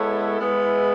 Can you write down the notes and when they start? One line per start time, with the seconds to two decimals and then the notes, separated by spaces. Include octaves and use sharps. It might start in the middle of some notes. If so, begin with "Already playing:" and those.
Already playing: G#3 B3 E4 A4 C#5
0.39 G#3 B3 E4